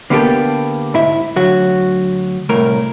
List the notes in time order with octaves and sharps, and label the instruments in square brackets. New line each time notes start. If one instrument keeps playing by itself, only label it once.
[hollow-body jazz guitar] D3 A#3 B3 E4 G4 A4
G#2 E4 E5
D2 F#3 F#4
C2 A2 A3 A#4